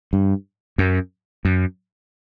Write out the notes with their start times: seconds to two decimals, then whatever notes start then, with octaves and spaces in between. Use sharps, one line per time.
0.13 G2
0.78 F#2
1.45 F#2